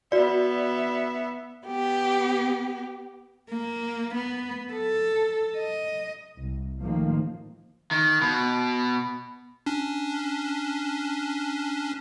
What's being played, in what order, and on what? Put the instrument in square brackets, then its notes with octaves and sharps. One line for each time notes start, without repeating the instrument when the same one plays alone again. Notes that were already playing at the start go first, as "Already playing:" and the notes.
[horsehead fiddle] B3 E5 [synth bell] F#4 D5
[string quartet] B3 G4
[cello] A#3
B3
A4
D#5
[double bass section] C2
A1 D#3 F3 A#3
[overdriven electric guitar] D#3
B2
[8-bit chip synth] C#4 D4